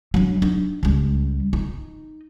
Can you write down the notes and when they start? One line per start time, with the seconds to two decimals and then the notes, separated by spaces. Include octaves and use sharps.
0.14 F#3 D4
0.42 D4 D#4
0.83 C#2 G3
1.53 D#4